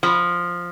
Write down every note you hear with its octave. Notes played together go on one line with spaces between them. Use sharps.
F3